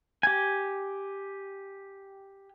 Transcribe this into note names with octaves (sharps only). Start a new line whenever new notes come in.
G4 G#5